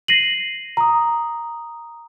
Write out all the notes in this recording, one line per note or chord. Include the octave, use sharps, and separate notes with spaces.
A#6 C7 D#7 F#7
A#5 D#6